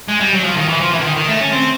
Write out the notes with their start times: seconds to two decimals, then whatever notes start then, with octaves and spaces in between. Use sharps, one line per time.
0.08 G#3
0.20 G3
0.33 F#3
0.44 F3
0.56 D#3
0.69 E3
0.80 F3
0.92 E3
0.99 D3
1.04 D#3
1.16 D#3
1.28 A3
1.41 C#4
1.52 C4